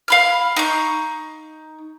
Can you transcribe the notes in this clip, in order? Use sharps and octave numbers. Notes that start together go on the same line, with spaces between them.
F5 B5 F6
D#4 C#6